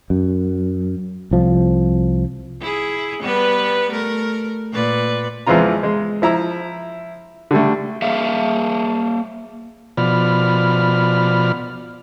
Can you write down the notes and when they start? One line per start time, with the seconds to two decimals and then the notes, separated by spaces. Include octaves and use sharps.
0.10 F#2
1.31 C2 F3
2.61 E4 G#4
3.22 G3 B3 B4
3.91 A3 A#4
4.72 A#2 B4 D5
5.47 E2 E3 F3 G#3 F4 A#5
5.83 G#3
6.22 F3 E4 A#5 E6
7.51 D3 G3 A3
8.02 A#3 G#4 E5 F5
9.97 B2 F3 D5 B5 F6